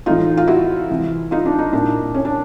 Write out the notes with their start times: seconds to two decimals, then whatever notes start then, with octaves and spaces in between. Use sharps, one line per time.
0.06 A2 E3 D#4 F4
0.37 F4
0.48 E4 F#4
0.90 C3 E3
1.31 D#4 F4
1.46 D4
1.59 D#4
1.73 A#2 D4 E4
2.14 C#4
2.25 D4